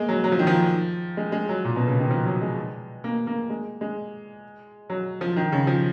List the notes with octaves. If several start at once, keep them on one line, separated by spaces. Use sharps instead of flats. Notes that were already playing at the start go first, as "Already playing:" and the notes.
Already playing: G#3 A#3
F#3
F#3
F3
D#3
F3
G#3
G#3
F#3
A#2
B2
C#3
D#3
F3
F#3
G#3
A#3
A#3
G#3
G#3
F#3
F3
D#3
C#3
F3